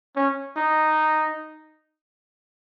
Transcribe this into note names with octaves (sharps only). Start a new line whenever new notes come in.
C#4
D#4